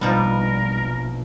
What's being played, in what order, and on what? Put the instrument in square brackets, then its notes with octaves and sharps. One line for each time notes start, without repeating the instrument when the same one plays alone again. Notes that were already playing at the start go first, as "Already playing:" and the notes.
[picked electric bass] A#1 B2 [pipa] F3 D#4 B4 [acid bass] G3 [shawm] A#4